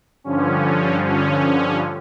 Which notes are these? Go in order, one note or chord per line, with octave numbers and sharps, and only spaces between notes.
G2 D3 F3 C#4
C#4